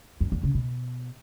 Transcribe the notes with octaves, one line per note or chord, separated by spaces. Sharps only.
F#2
E2
C#3
B2